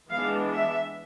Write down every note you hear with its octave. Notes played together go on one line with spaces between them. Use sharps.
E3 G#3 B3 D4 F5
E5